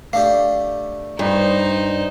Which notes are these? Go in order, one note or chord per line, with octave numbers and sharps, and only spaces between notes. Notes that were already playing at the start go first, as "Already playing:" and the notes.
A3 D4 G4 F5
G2 D#4 C5